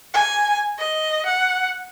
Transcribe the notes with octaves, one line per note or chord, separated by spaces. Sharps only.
G#5
D#5
F#5